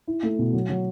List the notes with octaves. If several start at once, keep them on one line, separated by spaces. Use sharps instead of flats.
E4
A3
B2
F#3
F#3